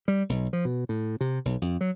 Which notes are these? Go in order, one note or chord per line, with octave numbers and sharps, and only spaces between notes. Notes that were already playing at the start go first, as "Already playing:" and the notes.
G3
B1
F3
B2
A2
C3
B1
F2
F#3